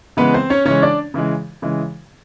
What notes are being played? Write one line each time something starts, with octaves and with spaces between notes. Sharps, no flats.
C#3 E3 G#3 B3 B4
C4 C5
C#4 C#5
C#3 E3 G#3 C#4 C#5
D4 D5
C#3 E3 G#3
C#3 E3 G#3